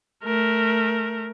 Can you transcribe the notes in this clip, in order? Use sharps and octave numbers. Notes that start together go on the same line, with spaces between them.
A3 A#4